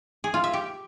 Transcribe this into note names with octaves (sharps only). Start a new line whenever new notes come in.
G#4
F4
E5
G4